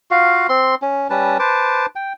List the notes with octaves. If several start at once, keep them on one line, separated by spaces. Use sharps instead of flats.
F4 F#4 F5
C4 C6
C#4
G3 C#4 B4 A5
B4 C5 A5 D6
G5